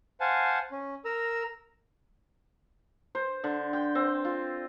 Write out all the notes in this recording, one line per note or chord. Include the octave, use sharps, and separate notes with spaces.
C5 F5 F#5 G#5 A5
C#4
A#4 A#5 E6
C5
D3
G5
C4
F4